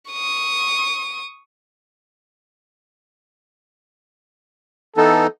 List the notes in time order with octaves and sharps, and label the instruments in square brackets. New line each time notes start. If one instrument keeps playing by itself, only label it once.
[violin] C#6 D#6
[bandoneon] E3 B3 D#4 [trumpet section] A4